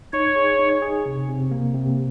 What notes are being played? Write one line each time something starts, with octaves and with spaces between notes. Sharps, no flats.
D#4 C#5
G#4
D#4
G#4
C3
C3
A#3
C3